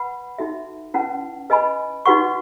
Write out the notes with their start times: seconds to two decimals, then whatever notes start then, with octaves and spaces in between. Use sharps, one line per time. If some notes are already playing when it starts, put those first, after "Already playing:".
Already playing: B4 F#5 B5
0.38 D#4 F#4 A4 E5
0.94 C#4 E4 B4 F#5 A5
1.50 B4 D#5 G#5 B5
2.06 D#4 F#4 B4 F#5 C#6